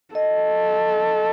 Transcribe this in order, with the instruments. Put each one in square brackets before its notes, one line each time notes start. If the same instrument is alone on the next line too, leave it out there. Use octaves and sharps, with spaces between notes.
[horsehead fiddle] A4 [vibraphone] D#5